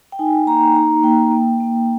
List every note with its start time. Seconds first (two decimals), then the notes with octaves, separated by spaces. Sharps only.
0.12 G5
0.19 D#4 G#5
0.47 A#3 A#5
0.75 D#4 A#5
1.03 A#3 G5
1.31 A#3
1.60 A#3